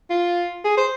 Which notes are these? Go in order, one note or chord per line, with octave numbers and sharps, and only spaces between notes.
F4
G#4
C5